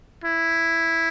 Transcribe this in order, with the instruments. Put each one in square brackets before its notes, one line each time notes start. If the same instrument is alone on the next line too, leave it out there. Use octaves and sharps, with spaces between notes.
[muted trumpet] E4